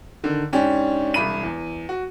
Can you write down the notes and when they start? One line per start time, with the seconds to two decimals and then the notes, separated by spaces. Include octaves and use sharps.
0.24 D3 D#3
0.53 G#2 C#4 D4 G4
1.14 E1 C2 B5 D#7
1.43 E2
1.89 F#4